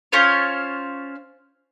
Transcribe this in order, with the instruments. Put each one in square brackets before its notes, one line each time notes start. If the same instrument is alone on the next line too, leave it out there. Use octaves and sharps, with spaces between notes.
[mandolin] C#4 F4 C5 C#5